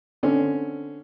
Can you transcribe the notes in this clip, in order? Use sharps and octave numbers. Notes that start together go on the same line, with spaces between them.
D3 C4 C#4